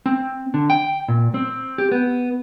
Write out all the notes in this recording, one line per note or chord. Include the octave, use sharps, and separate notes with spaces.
C4
D3
G5
A#2
C4
G4
B3